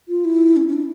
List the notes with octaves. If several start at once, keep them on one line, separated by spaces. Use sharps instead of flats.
F4
E4
C#4
C#4
D4